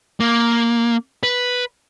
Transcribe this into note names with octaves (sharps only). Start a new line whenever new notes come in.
A#3
B4